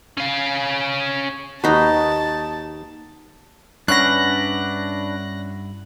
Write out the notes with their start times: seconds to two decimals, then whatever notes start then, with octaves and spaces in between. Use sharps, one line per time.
0.18 C#4 F5
1.64 D#2 D#4 F#4 B4 A5
3.88 G2 C#4 D4 E4 B4 F#5 F#6 A#6